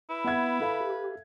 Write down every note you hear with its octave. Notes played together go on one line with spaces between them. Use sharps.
E4 B4
B3 E5 F#5 G#6
A4 E5 F5
G4